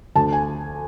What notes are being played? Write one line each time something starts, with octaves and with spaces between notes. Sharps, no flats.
D2 A5
G#5